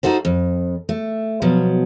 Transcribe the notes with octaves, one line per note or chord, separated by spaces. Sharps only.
D#4 F4 F#4 A4 C5
F2
A3
B2 F3 F#3